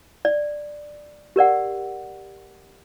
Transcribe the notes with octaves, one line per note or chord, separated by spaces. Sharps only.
D5
G4 A#4 D5 F#5